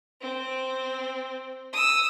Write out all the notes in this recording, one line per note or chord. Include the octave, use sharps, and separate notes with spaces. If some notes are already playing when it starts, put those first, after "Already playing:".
C4
D#6 E6